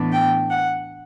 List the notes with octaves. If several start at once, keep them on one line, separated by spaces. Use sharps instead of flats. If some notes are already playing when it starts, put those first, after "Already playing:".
Already playing: A2 E3 B3 D4
G5
F#5